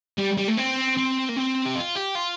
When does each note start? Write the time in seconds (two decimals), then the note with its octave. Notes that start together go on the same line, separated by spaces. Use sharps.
0.18 G3
0.38 G3
0.48 A3
0.57 C4
0.97 C4
1.29 A#3
1.37 C4
1.66 G4
1.76 F4
1.95 G4
2.15 F4